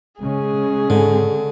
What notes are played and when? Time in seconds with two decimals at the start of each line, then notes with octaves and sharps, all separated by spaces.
0.20 C#3 G#3 C#4 G#4
0.90 G#2 D3